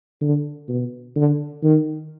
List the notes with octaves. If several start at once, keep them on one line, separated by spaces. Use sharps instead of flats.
D3
B2
D3
D#3